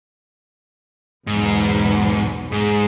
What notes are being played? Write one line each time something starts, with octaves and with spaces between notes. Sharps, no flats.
B1 E2 G#2
G#2 G#3